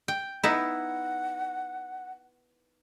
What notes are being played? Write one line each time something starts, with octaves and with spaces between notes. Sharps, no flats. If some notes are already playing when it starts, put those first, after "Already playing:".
G5
B3 D#4 E4 F#5